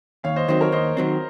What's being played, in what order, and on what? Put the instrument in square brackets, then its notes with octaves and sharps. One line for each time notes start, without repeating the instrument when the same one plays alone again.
[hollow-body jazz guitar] D#2 [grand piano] C#5 F5
[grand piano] C5 D#5
[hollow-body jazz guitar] D#3 F#3 C4 [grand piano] C5 D#5
[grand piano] A#4 C#5
[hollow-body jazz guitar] D#2 [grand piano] C5 D#5
[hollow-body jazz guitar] D#3 F#3 C4